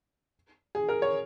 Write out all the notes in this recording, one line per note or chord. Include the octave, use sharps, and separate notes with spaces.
G#4
A#4
C#5